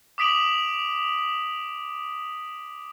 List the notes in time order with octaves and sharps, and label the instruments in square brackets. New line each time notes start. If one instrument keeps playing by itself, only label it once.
[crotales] D6 D#6 B6 D7 F7 F#7